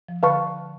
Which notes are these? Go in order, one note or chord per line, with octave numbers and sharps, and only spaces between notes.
F3
D3 B4 F5 A5 C#6